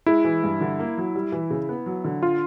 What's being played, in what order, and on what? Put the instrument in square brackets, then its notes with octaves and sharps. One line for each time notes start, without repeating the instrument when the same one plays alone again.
[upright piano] G#3 [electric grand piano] E4
[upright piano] E3
G2
D3
A#3
F#3
G3
E3
C#3
B3
F#3
D3
[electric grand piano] F4